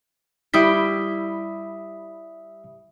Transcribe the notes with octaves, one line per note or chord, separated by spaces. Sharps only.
G3 E4 E5 G5 D#6 B6